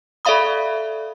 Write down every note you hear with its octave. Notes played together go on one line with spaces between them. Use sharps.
A4 D5 E5 F5 B5 D#6